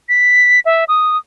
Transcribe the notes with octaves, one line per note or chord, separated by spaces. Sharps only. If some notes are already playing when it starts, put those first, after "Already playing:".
B6
E5
D#6